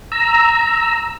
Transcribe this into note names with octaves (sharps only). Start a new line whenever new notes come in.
A#5 E6